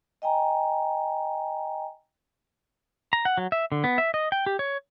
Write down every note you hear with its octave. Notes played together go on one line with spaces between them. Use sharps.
D#5 G5 G#5 A#5
A#5
F#5
F#3
E5
D3
B3
E5
D#5
G5
G4
C#5